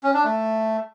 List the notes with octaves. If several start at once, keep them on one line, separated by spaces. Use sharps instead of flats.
C#4
D4
A3